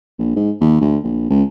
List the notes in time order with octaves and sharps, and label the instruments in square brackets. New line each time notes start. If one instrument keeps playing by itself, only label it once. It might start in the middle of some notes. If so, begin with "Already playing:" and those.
[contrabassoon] A#1
G#2
D#2
D2
A#1
C#2